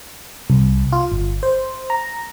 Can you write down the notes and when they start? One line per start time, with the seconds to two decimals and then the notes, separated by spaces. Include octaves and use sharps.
0.50 C2
0.92 F4
1.12 G1
1.43 C5
1.90 A#5